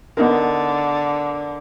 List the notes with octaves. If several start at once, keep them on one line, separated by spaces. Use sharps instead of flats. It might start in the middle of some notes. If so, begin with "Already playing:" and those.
D3 B3 D#4 A#4